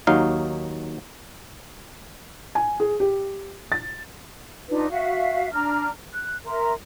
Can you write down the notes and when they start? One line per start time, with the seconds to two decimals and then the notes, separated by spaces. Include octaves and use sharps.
0.07 D#2 F#3 D#4 F5
2.55 G#5
2.80 G#4
3.00 G4
3.72 A6
4.69 D4 D#4 F4 B4
4.90 F#4 E5 F5
5.53 D4 A#5 F6
6.13 F#6
6.45 A#4 E5 A#5 C6